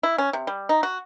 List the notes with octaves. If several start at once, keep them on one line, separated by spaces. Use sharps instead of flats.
E4
C#4
C3
G3
D#4
F#4